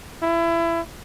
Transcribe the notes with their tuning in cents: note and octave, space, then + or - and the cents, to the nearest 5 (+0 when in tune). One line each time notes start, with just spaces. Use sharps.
E4 +25